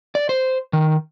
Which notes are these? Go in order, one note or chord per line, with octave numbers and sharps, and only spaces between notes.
D5
C5
D#3